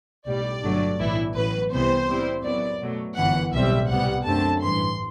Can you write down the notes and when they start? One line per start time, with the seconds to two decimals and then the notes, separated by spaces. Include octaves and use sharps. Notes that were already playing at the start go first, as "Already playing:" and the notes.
0.26 B1 A2 G3 D5
0.63 G1 G2 F#3 A3 D4
0.99 B1 A2 E3 B3 E4
1.36 A1 A2 F#3 B4
1.72 C2 C3 E3 B3 C5
2.09 A2 G3 C4 E4
2.44 F#2 F#3 B3 E4 D5
2.81 B2 F#3 A3
3.17 G1 F#2 E3 F#5
3.53 B1 A2 G3 C4 E5
3.90 C2 C3 G3 B3 F#5
4.26 F#2 D3 A3 C4 A5
4.62 A1 G2 E3 C6